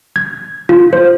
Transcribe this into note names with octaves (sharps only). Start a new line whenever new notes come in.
G#6
F4
C5